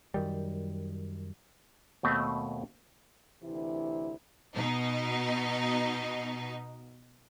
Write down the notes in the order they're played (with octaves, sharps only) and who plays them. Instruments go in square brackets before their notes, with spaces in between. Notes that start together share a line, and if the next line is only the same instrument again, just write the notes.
[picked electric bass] F#2 D#3 G3
[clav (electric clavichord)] D#2 B2 A3 C4
[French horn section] D2 C3 E3 E4
[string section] B2 D#4